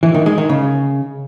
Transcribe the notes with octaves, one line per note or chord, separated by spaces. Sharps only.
E3
D#3
G#3
D#3
C#3